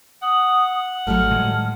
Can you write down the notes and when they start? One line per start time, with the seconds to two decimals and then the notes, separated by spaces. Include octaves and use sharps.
0.22 F#5 D#6
1.07 G#1 F#3 G3 A3 F6
1.31 A2 D#3 G#3